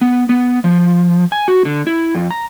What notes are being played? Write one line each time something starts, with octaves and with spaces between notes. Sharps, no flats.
B3
B3
F3
G#5
F#4
D3
E4
F2
A#5